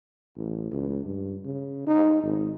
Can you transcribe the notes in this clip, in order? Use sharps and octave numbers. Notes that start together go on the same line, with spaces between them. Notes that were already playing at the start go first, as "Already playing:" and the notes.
A1
C#2
G2
C#3
D#4
G#1